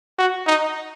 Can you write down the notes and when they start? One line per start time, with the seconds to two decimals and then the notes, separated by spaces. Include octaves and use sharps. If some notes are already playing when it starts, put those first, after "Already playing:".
0.19 F#4
0.47 D#4